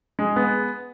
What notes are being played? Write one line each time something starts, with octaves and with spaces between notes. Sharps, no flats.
G#3
B3